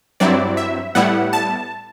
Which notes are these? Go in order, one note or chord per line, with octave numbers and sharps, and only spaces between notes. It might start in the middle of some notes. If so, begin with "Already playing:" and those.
G2 F#3 C4 E4 D5
E5
A2 G3 B3 E4 F#5
A5